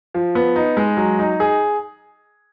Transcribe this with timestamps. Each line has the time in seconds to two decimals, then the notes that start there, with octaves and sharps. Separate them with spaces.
0.14 F3
0.35 B3
0.56 D#4
0.77 G#3
0.97 F#3
1.19 D#4
1.40 G#4